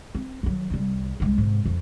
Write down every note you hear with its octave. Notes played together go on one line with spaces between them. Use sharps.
C4
D#3 F#3
C2 G3
C2 G#3
G#2 C3
F2